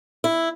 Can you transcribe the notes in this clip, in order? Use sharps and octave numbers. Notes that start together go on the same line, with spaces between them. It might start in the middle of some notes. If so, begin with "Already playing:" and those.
E4